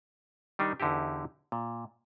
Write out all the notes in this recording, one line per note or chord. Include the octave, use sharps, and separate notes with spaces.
D#3 G3 D4 D#4
E2 D3 D#4 E4 G4
A#2